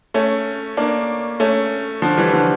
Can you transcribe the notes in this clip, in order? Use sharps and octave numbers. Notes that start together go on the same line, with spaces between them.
A3 C#4
A#3 D4
A3 C#4
D3 F3
E3 G3
D3 F3